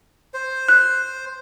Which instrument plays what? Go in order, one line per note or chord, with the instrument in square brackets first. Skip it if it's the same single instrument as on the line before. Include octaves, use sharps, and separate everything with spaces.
[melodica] C5
[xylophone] F#6